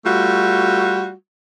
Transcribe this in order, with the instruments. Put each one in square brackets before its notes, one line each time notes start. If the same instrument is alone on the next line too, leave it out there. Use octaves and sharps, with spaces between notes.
[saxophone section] G3 A3 F4 F#4